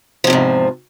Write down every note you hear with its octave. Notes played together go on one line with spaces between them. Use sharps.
E2 G#2 C3 F3